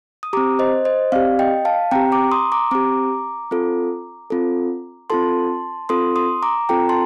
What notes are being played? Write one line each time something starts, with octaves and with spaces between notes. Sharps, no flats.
D#6
C4 G4 A#5 D6
C5 D#5
C5 D#5
C4 G4 D5 F5
D#5 G5
F5 A5
C4 G4 G5 A#5
A#5 D6
C6 D#6
A#5 D6
C4 G4 A#5 D6
C4 F4 A4
C4 F4 A4
C4 F4 A4 A5 C6
C4 F4 A4 C6 D#6
C6 D#6
A#5 D6
C4 F4 A4 G5 A#5
A5 C6